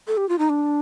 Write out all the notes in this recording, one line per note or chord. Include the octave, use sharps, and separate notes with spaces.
A4
G4
F4
D#4
D4